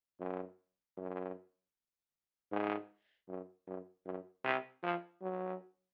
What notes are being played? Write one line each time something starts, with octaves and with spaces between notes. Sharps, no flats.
F#2
F#2
G#2
F#2
F#2
F#2
C3
F3
F#3